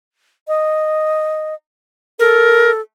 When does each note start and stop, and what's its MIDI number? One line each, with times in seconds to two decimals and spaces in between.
0.48 1.55 75
2.19 2.81 69
2.19 2.71 70